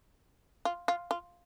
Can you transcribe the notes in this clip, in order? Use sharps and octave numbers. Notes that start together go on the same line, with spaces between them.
F4
F4
F4